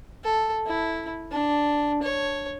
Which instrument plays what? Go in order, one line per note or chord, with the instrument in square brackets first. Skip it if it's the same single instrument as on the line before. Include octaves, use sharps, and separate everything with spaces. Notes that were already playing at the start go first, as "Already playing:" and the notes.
[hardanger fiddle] A4
E4
D4
C#5